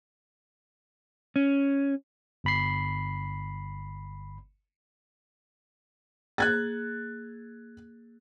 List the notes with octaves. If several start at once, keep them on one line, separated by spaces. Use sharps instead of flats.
C#4
G1 B5 C7
A#3 G#4 F#6 G#6 A6